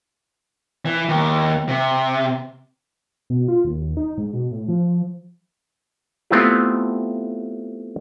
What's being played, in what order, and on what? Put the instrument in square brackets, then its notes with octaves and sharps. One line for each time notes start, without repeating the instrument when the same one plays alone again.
[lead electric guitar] E3
D#2
C3
[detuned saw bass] B2
F4
D#2
D#4
G#2
B2
A2
F3
[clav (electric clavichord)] A3 B3 C4 E4 F4 G4